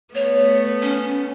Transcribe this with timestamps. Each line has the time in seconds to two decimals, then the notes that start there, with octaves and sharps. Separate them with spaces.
0.15 A3 B3 C#5
0.82 C#4